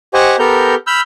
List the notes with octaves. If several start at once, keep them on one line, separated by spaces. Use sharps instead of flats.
G4 C5 D#5 F#5 G#5 C#6
B3 G4 A4 A#4 A#5 G6
B5 E6 F6 G6